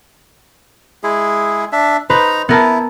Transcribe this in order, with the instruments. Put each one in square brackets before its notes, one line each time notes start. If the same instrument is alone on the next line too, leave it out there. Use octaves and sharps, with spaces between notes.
[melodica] G#3 E4 G#4
D4 E5
[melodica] D#4 A#5 [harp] B4 C5
[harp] B3 A#4 A5 [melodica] E4